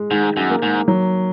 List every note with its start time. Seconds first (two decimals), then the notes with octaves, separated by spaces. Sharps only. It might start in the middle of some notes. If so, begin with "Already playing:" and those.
Already playing: G#3
0.11 G#2 D#3
0.37 F#2
0.50 A#3
0.62 G#2
0.88 F#3